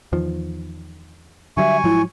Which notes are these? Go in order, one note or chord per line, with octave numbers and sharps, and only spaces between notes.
E2 D#3 F3
D3 F#3 G3 E5 G#5 C#6
G#2 F3 F#3 E4